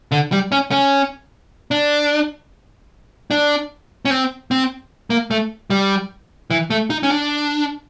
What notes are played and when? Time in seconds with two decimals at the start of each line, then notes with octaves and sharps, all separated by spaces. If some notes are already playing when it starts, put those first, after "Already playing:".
0.12 D3
0.32 G3
0.52 C#4
0.71 C#4
1.71 D4
3.31 D4
4.05 C#4
4.10 C4
4.51 C4
5.10 A#3
5.31 A3
5.70 G3
6.51 E3
6.70 A3
6.90 D#4
7.03 C#4
7.10 D4